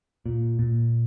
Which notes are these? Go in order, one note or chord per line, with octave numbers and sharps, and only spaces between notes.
A#2
A#2